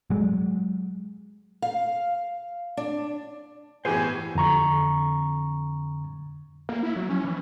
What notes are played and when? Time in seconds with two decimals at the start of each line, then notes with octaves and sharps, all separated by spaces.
0.10 F#3 G#3
1.62 F5
2.77 D4
3.85 A2 E3 B3 G4 G#4 C5 G#5
4.35 F2 D3 A#5 C#6
6.69 A#3
6.83 E4
6.96 F#3
7.09 C#4
7.24 E3